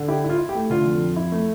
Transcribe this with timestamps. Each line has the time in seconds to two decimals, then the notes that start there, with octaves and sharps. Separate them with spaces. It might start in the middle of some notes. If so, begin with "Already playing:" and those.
Already playing: D3
0.08 E4 G4
0.24 E4
0.29 F4
0.39 E4
0.49 G4
0.55 A3
0.70 D3 F4
0.85 F2
1.01 F2
1.16 E4
1.32 A3